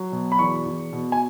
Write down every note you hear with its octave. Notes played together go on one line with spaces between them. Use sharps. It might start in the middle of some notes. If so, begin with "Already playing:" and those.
Already playing: F#3
B2
B5
E2 C#6
E2
B2
G#5